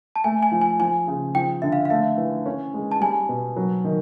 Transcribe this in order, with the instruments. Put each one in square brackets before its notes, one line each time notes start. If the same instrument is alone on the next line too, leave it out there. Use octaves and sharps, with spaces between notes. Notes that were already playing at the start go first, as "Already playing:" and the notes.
[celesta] A5
[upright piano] A3 [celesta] G#5
[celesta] G#5
[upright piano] F3
[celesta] G#5
[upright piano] F3 [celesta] G#5
[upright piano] C#3
[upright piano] F3 [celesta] G5
[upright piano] D3 [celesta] E5
[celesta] F5
F5
[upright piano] A3 [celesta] E5
[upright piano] E3
C#4
G#3
[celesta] A5
[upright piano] G3 [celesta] G#5
[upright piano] B2
F#3
D#3